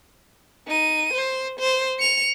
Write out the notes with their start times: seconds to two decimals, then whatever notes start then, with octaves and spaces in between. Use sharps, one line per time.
0.67 D#4 D#7
1.13 C5
1.59 C5
1.99 C#7 F7